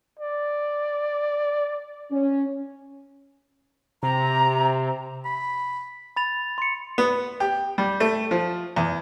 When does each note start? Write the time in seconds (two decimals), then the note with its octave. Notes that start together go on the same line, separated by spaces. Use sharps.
0.19 D5
2.11 C#4
4.03 C3 A#5
5.25 B5
6.16 B5 A6 F7
6.58 C6 C#7
6.98 B3
7.40 G4
7.78 G3
8.00 A3
8.31 F3
8.76 E2